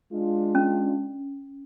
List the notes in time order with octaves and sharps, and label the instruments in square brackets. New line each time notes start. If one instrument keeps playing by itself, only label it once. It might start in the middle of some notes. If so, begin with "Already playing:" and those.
[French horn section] G#3 D4 F4
[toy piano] C#4